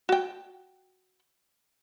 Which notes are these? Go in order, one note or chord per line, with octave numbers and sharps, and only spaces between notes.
F#4 G5